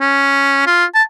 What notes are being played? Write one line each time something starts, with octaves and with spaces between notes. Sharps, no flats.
C#4
F4
A5